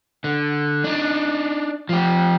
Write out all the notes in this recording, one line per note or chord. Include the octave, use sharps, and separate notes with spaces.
D3
D4 D#4
F3 G4